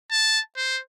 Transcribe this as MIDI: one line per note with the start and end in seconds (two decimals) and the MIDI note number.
0.11 0.40 81
0.57 0.79 72